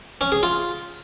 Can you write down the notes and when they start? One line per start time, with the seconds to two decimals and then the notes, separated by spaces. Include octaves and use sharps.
0.21 C#4
0.32 G#4
0.43 F4